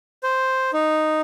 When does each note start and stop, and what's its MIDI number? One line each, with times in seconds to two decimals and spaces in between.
0.23 0.71 72
0.73 1.21 63